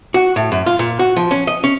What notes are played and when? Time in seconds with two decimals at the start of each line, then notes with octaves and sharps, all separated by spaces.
0.14 F#4
0.36 A2
0.52 F#2
0.66 F4
0.79 A#2
0.99 F#4
1.17 F3
1.31 C#4
1.47 D#5
1.64 C#4